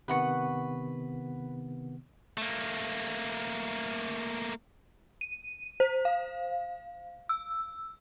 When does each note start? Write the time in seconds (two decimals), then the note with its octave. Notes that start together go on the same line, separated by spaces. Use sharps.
0.08 C3 D#3 B3 B4 F#5 C#6
2.38 A3 A#3
5.21 D#7
5.80 C5
6.05 F5
7.29 E6